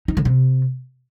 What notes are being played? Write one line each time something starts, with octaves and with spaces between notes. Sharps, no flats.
D#4
D3
C3